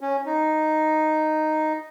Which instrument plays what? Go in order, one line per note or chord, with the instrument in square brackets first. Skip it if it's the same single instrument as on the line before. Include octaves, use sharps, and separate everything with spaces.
[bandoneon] C#4
D#4